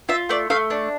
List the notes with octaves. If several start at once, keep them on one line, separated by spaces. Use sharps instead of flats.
F4 E5
A3 D5
A3 F5
D4